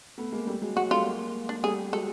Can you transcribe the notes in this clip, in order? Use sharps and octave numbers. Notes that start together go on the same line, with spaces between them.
A3 B3
G#3 A#3
G3 A3
F#3 G#3
F#3 G#3 F#4
G3 A3 F4
G#3 A#3
D4
G3 A3 G#4
F#3 G#3 A4